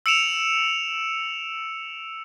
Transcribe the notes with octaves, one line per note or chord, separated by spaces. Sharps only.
E6 C#7 D7 E7 F7